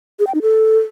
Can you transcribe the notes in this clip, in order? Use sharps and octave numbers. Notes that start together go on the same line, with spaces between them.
G#4
G5
D#4
A4